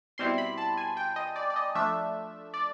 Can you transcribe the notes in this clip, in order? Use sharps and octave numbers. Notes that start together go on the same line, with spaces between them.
B2 G3 C4 E4 C6
B5
A5
G#5
G5
D#5
D5
D5
D#5
F3 A3 D4 E5
D5